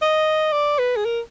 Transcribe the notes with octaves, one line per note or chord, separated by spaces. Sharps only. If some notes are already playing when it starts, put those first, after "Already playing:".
D#5
D5
B4
G#4
A#4